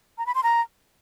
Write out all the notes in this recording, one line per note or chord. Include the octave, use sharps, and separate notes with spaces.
A#5
B5
C6
A#5